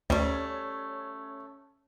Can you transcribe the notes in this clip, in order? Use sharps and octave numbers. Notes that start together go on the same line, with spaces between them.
D2 G3 A3 C#4 C#5